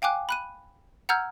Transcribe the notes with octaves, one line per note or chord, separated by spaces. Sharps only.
F5 G5 G#5 D6 F#6
B5 F#6 D#7
F#5 A#5 E6 F6 G6 G#6